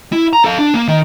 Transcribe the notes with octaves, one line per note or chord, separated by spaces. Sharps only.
E4
A#5
A4 F5
D4
A#3
D#3